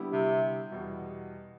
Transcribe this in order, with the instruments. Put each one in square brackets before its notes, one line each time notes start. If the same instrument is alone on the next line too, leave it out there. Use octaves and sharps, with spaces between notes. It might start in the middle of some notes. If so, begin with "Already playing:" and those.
Already playing: [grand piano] D3 G3 B3 E4 G4
[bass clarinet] C3
[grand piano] E2 B2 G3